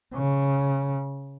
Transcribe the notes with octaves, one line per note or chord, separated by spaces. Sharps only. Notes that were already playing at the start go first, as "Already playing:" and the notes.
C#3